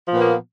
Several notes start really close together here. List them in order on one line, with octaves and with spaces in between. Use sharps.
F3 A#2 B3 A#3